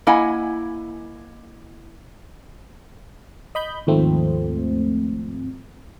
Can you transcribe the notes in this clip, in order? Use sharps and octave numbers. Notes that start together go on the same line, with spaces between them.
A#3 E4 D#5 F#5 G#5
D#5 B5 G6
D#2 G#2 F3 A3 C4